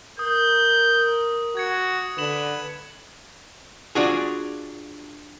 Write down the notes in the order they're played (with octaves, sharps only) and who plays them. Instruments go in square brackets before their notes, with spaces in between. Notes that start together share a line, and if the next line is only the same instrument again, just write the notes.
[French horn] A#4 [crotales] D#6 [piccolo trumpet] G6
[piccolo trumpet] F#4 [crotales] G#6 C#7
[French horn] D3 [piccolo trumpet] B4 [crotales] E7 F#7
[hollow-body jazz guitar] D4 F4 F#4 G#4